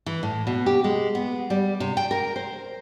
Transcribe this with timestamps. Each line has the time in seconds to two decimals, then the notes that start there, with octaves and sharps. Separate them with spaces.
0.06 E3
0.23 A2
0.47 B2
0.66 G4
0.84 G#3
1.15 B3
1.50 G3
1.80 C3
1.97 G5
2.11 A#4
2.36 C5